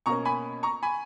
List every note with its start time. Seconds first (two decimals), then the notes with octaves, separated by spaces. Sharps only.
0.06 B2 A#5 C#6
0.09 A#3 C#4
0.25 G#5 B5
0.63 A#5 C#6
0.83 G#5 B5